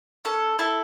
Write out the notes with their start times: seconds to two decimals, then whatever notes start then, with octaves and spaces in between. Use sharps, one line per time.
0.25 C#4 A4
0.59 E4 A4